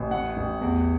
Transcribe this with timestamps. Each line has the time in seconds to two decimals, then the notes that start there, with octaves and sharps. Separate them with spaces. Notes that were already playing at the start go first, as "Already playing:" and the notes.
Already playing: A1
0.11 A2 F#5
0.36 A1
0.61 E2